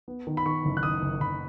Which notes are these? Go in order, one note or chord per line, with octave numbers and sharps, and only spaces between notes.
B3
D#3
B5
D#3 C#6
F#1
F#6
D#3 D#6
F#1
F#1 B5